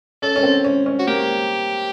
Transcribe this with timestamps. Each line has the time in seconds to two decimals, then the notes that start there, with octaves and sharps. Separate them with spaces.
0.22 C#4 A4
0.36 C#4
0.43 C4
0.64 C#4
0.86 C#4
0.99 F#4
1.07 A#3 G4